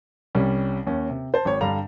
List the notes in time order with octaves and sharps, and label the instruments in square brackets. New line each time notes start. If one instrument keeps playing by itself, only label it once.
[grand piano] C2 G3 C#4
D#2 C#4
C3
C5 A5
G#1 C#5
G2 D3 G3 F5 A#5 F7